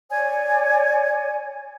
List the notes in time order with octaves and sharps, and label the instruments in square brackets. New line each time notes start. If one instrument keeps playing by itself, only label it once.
[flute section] C#5 D5 G#5